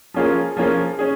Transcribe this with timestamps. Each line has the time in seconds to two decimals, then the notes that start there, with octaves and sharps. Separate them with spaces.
0.14 F3 A#3 C#4 F4 G#4
0.56 F3 A#3 C#4 F4 G#4
0.99 C#4 G#4